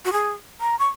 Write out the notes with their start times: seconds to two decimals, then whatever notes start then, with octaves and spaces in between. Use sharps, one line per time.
0.05 F#4
0.12 G#4
0.61 A#5
0.79 C#6